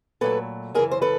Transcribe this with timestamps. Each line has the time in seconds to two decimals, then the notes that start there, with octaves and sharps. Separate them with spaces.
0.21 A#2 F#3 A3 A4 B4
0.74 F#2 C#3 E3 G#4 A#4
0.91 C5
1.02 A4 B4